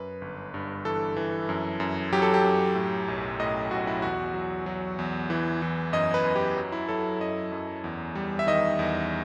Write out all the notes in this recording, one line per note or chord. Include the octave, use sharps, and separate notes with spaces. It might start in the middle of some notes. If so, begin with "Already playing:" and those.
Already playing: F#2 B4
G1
G2
E3 A4
E3
F#2
F#2
F#3 G4
A4
G4
F#2
A2
B1
A2 D#5
B1 F#4
E4
E2 F#4
F#3
F#3
E2
E3
E3
F#2 D#5
B4
F#2
G4
F#3
E4
F#3 A4
F#2 D#5
F#2
E2
G3
E5
D#3 D#5
E2